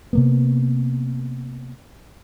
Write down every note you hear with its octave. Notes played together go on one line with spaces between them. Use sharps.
C3 A#3 B3